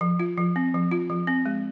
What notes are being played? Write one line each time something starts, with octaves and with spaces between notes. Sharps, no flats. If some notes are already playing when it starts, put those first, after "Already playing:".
F3
F4
F3
C4
F3
F4
F3
C4
G#3